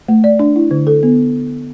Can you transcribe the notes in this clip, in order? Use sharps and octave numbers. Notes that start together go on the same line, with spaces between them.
A3
D5
D4
E4
D3
A4
B3